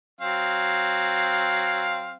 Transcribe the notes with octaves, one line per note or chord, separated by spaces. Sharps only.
F#3 C4 F5